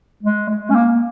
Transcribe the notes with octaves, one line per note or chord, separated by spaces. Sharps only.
G#3
G#3
C#4
A#3